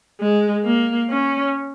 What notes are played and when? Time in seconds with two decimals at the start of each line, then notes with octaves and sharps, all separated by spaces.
0.20 G#3
0.64 A#3
1.10 C#4